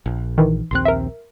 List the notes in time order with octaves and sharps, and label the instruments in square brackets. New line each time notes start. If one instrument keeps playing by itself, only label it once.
[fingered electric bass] A#1
[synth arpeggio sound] D#3 E3
[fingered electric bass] A#1 D#2 C4 [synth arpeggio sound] C6 F#6
[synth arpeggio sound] A#4 E5